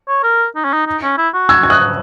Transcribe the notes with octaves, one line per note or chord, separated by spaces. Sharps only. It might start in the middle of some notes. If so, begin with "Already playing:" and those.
C#5
A#4
D#4
C#4
D#4
D#4
C#4
E4
F#4
E6 G#6
G#6
D#6 F#6